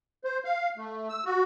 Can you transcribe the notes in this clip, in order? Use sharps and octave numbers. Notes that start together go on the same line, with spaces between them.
C5
F5
A3
E6
F#4